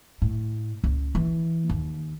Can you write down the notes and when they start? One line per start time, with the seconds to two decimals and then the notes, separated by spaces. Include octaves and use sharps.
0.22 A2
0.84 C#2
1.15 E3
1.70 D#2